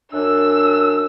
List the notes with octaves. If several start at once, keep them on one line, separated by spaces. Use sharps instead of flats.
F#2 D4 E6